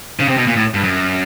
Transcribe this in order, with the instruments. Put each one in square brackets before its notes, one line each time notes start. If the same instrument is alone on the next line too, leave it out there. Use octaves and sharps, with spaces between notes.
[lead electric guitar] C#3
C3
B2
A#2
A2
G2
F#2